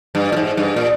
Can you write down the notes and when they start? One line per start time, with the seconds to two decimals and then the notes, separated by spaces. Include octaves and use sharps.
0.15 G2
0.32 A#2
0.37 G#2
0.57 G2
0.76 A#2